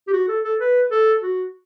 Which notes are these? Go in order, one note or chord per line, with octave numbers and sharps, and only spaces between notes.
G4
F#4
A4
A4
B4
A4
F#4